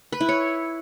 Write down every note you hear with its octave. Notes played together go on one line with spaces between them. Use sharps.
B4
E4
C#5